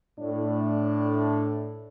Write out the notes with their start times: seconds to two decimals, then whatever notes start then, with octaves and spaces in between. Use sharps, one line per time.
0.19 A2 D4